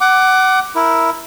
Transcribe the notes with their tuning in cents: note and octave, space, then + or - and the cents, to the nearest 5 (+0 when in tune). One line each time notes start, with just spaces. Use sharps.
F#5 +20 D6 +0
E4 +0 A#4 +0